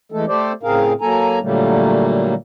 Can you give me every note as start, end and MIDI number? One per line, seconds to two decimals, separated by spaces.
0.12 0.25 52
0.12 0.25 56
0.12 0.25 57
0.12 0.25 69
0.28 0.53 57
0.28 0.53 67
0.28 0.53 69
0.28 0.53 72
0.28 0.53 74
0.63 0.93 45
0.63 0.93 49
0.63 0.93 60
0.63 0.93 68
0.63 0.93 70
0.63 0.93 77
1.01 1.39 54
1.01 1.39 58
1.01 1.39 69
1.01 1.39 80
1.01 1.39 82
1.42 2.34 46
1.42 2.34 50
1.42 2.34 54
1.42 2.34 55
1.42 2.34 57
1.42 2.34 58